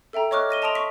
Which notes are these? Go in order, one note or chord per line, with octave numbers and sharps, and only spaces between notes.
A4 E5 G5 A#5
C#5 D#5 C#6 D6 F6 F#6
D#5 A#6 D#7 G7
D#5 A5 C6 D#6 D7 F7
C#6 B6